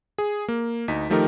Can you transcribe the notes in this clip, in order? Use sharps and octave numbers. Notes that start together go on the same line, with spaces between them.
G#4
A#3
D2 D#4 B6
D#3 F3 A3 D#4 G4 A#4